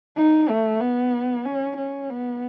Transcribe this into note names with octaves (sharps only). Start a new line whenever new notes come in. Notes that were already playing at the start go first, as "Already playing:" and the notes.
D#4
A3
B3
C#4
C#4
B3